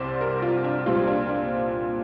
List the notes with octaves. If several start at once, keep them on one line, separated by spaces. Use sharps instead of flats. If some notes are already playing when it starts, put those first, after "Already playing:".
Already playing: C2 C3 G3 C4 C5 D5
A#4
F4
D4
A#2 G3 C4 F4
D4
D4